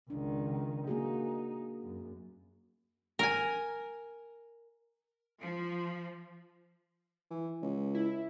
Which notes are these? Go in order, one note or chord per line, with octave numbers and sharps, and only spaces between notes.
C#2 D#3 D4
A#3 D#4 F#4 G#4
F#2
A#4 G#5
F3
E3
C#2
E4